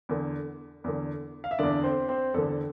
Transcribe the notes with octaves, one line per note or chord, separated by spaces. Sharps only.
E2 D3
E2 D3
F5
E5
E2 D3 D4 D5
C4 C5
C4 C5
E2 D3 A4